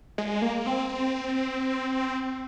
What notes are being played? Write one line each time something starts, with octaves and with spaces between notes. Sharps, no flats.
G#3
A#3
C4